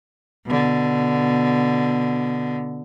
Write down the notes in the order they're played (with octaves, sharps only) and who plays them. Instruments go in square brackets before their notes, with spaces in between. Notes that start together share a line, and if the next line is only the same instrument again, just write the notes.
[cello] B2 D3